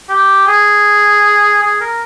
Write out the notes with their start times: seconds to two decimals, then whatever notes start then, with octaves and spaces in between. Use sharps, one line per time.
0.09 G4
0.47 G#4
1.62 G#4
1.81 A#4